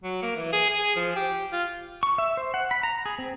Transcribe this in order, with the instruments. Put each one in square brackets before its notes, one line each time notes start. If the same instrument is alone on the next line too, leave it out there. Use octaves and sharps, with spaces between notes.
[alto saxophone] F#3
A#3
E3
G#4
G#4
F3
G4
F4
[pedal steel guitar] C#6
E5
C5
F#5
B5
A#5
G#4
C4